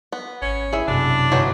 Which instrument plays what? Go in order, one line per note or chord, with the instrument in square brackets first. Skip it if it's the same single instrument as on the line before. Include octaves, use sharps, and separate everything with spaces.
[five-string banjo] B3
[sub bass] G#1 [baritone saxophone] C#4
[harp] E4 [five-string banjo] G#4 E5
[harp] B1 F#2 [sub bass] C3 [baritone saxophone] D4
[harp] G1 D6 G6 [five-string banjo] E3 F#3 G#3